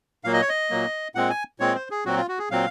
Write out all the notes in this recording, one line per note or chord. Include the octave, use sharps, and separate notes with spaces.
A#2 F#3 A#3 F5
D#5
C#5
D#5
A#2 F#3 A#3
A#2 G#3 C4 F#5
G#5
A#2 G#3 C4 C#5
C5
G#4
A#2 F#3 C4 F#4
F4
F#4
G#4
A#2 F#3 C4 F5